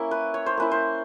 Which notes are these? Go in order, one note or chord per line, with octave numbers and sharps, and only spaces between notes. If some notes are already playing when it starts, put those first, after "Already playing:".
Already playing: A#3 C#4 E4
B4
C#5
C5
A#3 C#4 E4 B4
C5